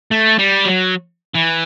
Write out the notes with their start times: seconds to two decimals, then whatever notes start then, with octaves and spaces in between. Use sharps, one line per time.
0.11 A3
0.39 G3
0.66 F#3
1.34 E3